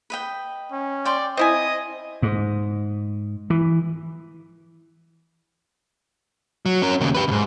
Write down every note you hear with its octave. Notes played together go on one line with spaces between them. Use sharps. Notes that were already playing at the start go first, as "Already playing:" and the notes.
B4 D#5 G5
C#4
D5 G5 C6
C4 E4 D#5 G#5 D#6
G#2
E3
F#3
C#4 A#4
D#2 C#3
G4 B4
D2 G#2